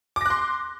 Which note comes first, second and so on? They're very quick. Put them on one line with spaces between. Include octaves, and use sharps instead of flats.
D6 A#6 F#6 C6